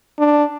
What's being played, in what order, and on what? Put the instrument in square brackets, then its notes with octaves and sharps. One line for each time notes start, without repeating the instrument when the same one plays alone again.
[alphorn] D4